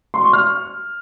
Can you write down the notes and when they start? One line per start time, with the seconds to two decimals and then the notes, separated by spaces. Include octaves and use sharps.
0.14 C6
0.24 C#6
0.33 F6